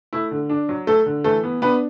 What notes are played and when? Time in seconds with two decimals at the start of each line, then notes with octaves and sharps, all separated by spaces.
0.13 A3 E4
0.31 D3
0.49 D4
0.69 F#3
0.87 A3 A4
1.06 D3
1.24 E3 A3 A4
1.44 B3
1.62 B3 D4 B4